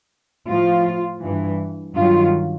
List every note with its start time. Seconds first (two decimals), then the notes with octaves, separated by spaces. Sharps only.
0.48 A2 F3 F4
1.22 G2 E3
1.96 G2 D#3 F#3 F4